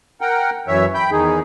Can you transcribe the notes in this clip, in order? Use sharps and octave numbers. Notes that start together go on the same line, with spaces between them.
A#4 F#5 G5
F#2 E3 C#5 E5
G5 B5 G6
E2 D#3 D#4 G#4